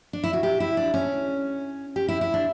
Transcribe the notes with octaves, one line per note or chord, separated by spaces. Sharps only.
D4
E4
F#4
G4
E4
D4
C#4
G4
E4
E4
D4